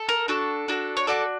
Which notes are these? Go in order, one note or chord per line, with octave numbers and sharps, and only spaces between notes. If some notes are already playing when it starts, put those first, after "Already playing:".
Already playing: A4
A#4
D4 F#4 A4
D4 F#4 A4
C#5
D4 F#4 A4 D5